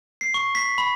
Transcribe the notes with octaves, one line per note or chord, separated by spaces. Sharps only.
C7
C#6
B6
B5